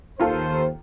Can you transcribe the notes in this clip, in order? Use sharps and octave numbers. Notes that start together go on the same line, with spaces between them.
D#2 D#3 F4 A4 C5